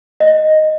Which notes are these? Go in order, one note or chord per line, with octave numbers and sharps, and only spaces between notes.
D#5